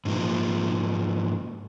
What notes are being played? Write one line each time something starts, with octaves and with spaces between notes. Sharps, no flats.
G#2 F3 A#3